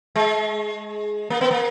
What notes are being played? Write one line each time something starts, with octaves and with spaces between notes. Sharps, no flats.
G#3
A#3
B3
A#3